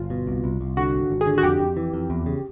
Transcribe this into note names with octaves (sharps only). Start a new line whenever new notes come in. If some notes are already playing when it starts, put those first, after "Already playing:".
Already playing: G1 F4
B2
C2
C2
C2
D3 F#4
G#1
G#1
G#4
D3
F#4
F2 G4
F2
E3
F2
E2
C#3